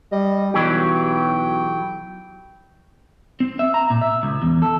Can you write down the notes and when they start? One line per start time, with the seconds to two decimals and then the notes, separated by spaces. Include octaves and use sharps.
0.12 G3 D#5
0.54 B1 E3 F#3 G4 G5
3.40 C4
3.59 E5
3.74 A#5
3.90 A#2
4.02 E5
4.23 C#2
4.42 E2
4.62 A4